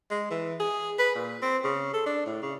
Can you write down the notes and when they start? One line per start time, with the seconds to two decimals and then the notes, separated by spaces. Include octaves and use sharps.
0.10 G#3
0.30 E3
0.60 G#4
0.99 B4
1.15 A#2
1.42 C4
1.64 C#3
1.93 A4
2.06 D4
2.26 A2
2.42 C#3